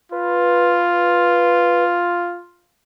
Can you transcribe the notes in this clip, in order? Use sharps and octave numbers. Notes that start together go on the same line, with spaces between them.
F4 B4